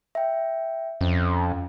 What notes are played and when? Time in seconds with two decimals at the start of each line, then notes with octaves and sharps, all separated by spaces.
0.15 E5 G5
1.01 F2 C#4